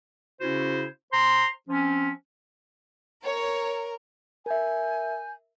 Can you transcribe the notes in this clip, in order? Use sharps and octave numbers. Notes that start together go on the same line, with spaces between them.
C#3 C#4 E4 F#4 C5
C5 A#5 C6
F3 C4 C#4
A#4 C#5
A#4 E5 G#5 G6